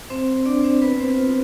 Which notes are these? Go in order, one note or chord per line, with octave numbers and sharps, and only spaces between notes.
C4 C5
D4 D5
C4 C5
B3 B4
C4 C5
F4